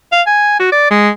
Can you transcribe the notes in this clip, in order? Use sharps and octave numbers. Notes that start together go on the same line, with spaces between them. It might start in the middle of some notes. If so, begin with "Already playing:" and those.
F5
G#5
F#4
D5
G#3